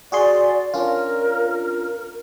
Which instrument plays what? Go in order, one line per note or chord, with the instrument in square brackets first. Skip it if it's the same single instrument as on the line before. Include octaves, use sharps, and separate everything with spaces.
[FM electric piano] F#4 G#4 C6 [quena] D5
[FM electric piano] C#4 D4 F4 [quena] A#4